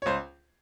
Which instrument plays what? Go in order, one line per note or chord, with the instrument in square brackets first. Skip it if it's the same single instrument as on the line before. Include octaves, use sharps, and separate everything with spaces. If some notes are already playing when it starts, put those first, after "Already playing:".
[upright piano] C#5
C#2 C5